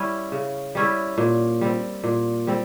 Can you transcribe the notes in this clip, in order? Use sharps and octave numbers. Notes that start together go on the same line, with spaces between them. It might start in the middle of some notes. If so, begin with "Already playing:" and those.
Already playing: G3 C#4 E4
C#3
G3 C#4 E4
A#2
G3 C4
A#2
G3 C4